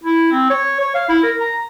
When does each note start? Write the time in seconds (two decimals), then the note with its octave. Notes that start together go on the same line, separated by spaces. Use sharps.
0.04 E4
0.32 C4
0.50 C#5
0.80 C#5
0.95 F5
1.09 E4
1.23 A#4
1.40 A#5